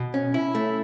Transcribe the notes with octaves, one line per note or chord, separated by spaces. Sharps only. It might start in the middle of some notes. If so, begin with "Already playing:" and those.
Already playing: B2
C#4
E4
A3